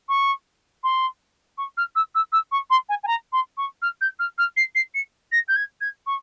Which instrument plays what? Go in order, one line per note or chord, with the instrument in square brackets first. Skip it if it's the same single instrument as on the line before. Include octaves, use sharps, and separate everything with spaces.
[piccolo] C#6
C6
C#6
F6
E6
E6
E6
C#6
C6
G#5
G#5
A#5
C6
C#6
F6
G6
F6
F6
C7
C7
C#7
A#6
G6
G#6
G#6
C#6